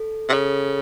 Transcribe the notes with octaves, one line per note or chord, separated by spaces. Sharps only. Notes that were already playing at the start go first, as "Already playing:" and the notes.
Already playing: A4
C3
C#3 A4